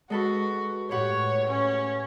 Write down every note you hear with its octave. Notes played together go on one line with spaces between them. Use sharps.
G#3 F#4 A4 B4
A2 G4 B4 C#5 F#5
C#4